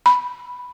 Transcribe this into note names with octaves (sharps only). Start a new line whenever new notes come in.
B5